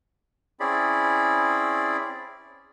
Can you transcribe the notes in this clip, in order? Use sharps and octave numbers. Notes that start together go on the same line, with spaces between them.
C4 C#4 E4 G#4 D5 B5